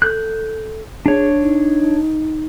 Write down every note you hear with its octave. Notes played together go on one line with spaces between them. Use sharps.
A4 F#6 G6
D4 G#4 C#5
D#4